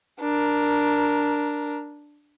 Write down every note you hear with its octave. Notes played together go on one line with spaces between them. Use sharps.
D4 A#4